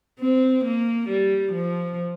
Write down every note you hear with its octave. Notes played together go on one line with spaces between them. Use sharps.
C4
A#3
G3
F3